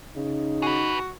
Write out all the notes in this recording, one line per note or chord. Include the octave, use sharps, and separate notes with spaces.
C#3 D#4
F#4 G#4 B4